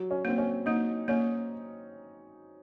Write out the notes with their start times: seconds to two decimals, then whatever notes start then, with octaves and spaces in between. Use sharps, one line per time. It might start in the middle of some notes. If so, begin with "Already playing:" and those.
Already playing: F#3
0.11 C#4
0.25 A#3 C4
0.38 C#4
0.66 A#3 D#4
1.08 A#3 C#4